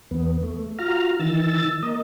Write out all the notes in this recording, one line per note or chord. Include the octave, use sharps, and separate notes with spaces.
E2 B3
A3
F4 F#4 A#5 F6
D#3 E3 E6 A6
A#3 D#5